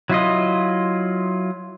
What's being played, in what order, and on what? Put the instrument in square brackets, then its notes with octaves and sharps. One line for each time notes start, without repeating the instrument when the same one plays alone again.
[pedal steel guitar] F#3 E4 F4 D#5